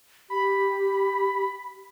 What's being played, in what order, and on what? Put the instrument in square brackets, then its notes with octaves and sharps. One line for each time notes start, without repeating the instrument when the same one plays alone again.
[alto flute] G4 [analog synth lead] B5